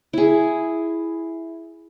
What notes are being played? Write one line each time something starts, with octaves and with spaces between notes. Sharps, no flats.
E4 G#4